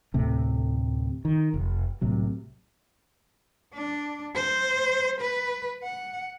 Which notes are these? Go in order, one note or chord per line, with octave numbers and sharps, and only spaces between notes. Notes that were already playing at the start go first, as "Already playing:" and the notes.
D2 A2 C3 A3
D#3
F1
C2 A2 C3 F#3
D4
C5
B4
F#5